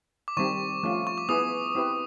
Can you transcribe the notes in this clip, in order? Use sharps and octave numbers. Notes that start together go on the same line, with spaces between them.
D6
D#3 G3 C4 C#6
F3 A3 C#4 F4
C#6
D6
B3 E4 G#4 B4 D#6
C4 E4 G4 B4